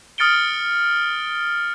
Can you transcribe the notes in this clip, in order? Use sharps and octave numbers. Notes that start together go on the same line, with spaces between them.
D#6 F6 A6 C#7 D7 G7